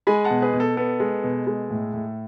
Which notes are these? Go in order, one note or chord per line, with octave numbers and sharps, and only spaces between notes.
G#3 G#5 B5
F#5 A5
B2
G#4 B4
B2
A4
B3 A4
G#3
B2
G#3
A2
A2